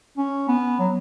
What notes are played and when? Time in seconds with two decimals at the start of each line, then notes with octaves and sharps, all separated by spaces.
0.17 C#4
0.48 B3
0.79 F#3